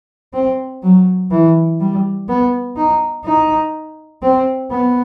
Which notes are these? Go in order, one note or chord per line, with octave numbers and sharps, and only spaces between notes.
C4
F#3
E3
G3
B3
D#4
D#4
C4
B3